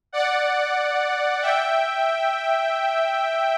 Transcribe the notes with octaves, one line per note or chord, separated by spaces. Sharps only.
D5 F#5
E5 G5